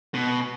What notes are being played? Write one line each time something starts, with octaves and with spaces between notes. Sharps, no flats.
B2